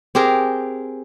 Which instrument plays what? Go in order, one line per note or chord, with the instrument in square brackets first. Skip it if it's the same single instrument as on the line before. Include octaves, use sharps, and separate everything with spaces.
[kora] C4 G4 G#4 A#4